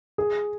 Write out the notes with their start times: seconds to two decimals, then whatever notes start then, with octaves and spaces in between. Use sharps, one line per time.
0.18 G#4